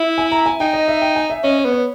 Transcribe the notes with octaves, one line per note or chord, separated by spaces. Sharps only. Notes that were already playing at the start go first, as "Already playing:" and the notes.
Already playing: E4
G#5
A#5
G#5
D#4 G5
D#5
E5
G5
G#5
E5
C#4 D#5
C#5
B3
C#5